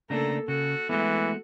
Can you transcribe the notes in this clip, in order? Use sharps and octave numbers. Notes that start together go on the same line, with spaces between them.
C#3 A3 A#3 D4 A4 A#5
C#3 F#4 A4
E3 G#3 A3 B3 F#4